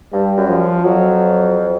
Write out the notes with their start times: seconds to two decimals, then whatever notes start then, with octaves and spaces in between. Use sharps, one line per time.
0.13 G2 G3
0.37 F#2
0.49 F3
0.84 F2 F#3